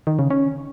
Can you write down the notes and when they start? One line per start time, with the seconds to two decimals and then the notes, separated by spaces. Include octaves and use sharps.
0.07 D#3
0.19 C#3
0.30 C#4